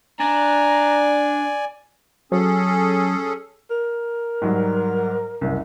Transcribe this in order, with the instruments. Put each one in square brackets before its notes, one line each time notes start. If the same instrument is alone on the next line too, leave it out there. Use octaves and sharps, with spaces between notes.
[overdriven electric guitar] D4 [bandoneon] D5 G#5 [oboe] A#5
[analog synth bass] F#3 [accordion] C#4 G#4 A4
[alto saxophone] A#4
[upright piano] G#2 F#3 G3
F#1 C2